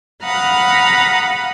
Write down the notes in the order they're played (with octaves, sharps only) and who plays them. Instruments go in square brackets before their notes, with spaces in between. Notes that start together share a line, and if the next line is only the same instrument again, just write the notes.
[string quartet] F5 F#5 A#5 B5 D#6 F#6